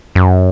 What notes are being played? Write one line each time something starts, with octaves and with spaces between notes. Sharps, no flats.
F#2